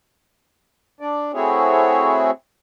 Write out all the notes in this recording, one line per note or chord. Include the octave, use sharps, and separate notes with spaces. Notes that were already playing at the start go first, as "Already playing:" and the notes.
D4 D5
A3 C4 E4 F#4 G#4 C#5